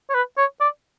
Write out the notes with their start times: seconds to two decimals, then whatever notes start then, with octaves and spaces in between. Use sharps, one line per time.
0.10 C#5
0.14 B4
0.38 C#5
0.61 D5